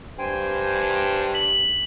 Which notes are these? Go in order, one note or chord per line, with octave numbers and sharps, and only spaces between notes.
G2 C5 G5 G#5
B6 F#7